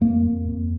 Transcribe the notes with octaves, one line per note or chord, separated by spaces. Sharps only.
F2 A#3
F2
F2